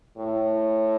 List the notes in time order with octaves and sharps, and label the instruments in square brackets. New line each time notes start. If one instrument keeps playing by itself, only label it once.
[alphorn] A2